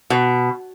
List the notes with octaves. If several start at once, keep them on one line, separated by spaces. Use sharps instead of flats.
B2